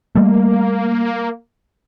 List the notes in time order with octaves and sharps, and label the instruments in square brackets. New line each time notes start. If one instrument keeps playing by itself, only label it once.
[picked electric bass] G3 A3 [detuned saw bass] A#3